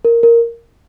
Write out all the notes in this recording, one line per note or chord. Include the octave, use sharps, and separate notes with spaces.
A#4
A#4